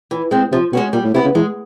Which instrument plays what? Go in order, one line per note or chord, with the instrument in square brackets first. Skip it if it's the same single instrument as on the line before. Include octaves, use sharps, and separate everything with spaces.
[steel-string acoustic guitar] E3
G#3 C4
[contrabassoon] C3 [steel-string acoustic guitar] F3
[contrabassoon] B2 [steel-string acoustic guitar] G#3 C#4 F#4
[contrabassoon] A#2 [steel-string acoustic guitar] G3
[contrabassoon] A2
[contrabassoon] C3 [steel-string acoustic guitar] B3 E4
[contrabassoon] C#3
[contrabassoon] E3 [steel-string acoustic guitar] G#3